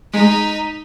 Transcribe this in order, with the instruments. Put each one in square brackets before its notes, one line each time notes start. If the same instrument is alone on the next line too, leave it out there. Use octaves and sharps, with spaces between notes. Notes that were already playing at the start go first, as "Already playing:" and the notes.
[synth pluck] G#3 [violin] D#4 B6